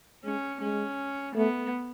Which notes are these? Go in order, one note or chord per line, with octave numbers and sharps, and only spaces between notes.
G#3 C#4
G#3 C#4
A3 B3